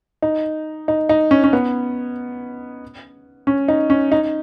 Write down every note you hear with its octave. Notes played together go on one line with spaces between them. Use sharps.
D#4
D#4
D#4
C#4
C#4
B3
C#4
D#4
C#4
D#4